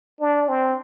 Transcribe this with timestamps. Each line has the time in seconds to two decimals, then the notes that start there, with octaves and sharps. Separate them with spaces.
0.21 D4
0.49 C4